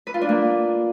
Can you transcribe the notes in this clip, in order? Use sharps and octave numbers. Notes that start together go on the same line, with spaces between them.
B4
F4
D4
A#3